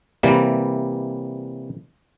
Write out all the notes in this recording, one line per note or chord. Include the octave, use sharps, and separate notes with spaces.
C3 E3 G3 A#3